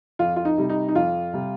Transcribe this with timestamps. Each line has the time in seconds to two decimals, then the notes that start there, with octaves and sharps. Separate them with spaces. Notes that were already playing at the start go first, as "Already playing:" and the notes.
0.19 F2 F4
0.36 F4
0.45 D#4
0.58 C3 G3
0.69 D#4
0.88 D#4
0.95 F2 F4
1.33 C3 G3